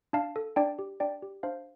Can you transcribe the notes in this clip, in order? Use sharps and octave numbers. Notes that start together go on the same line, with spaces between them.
D4 F5 A5
A4
D4 D5 G5
G4
D4 D5 G5
G4
D4 C5 F5